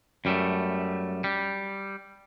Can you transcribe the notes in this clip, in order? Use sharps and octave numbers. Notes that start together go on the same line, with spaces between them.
F#2 G3 A3
G3